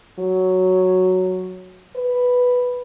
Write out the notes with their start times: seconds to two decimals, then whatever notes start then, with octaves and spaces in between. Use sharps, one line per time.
0.19 F#3
1.96 B4